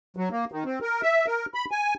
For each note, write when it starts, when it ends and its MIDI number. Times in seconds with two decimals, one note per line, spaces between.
0.17 0.29 54
0.31 0.45 58
0.52 0.64 51
0.65 0.79 60
0.81 1.02 70
1.02 1.26 76
1.26 1.46 70
1.54 1.65 83
1.71 1.94 80